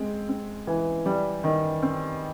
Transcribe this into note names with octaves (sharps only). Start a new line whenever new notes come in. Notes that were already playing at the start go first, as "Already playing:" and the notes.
Already playing: G#3 C4
C4
E3
G3
D#3
C4